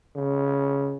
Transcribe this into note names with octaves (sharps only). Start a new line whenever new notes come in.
C#3